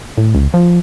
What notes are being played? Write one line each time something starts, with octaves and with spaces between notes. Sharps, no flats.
A2
C#2
F3